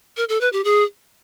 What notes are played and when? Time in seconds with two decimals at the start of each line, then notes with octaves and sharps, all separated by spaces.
0.17 A#4
0.29 A4
0.41 B4
0.52 G4
0.64 G#4